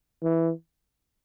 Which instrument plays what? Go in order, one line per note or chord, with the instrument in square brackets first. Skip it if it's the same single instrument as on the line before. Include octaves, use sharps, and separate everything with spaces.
[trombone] E3